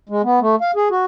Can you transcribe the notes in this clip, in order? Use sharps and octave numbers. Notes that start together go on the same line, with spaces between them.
G#3
B3
A3
F5
G#4
F#4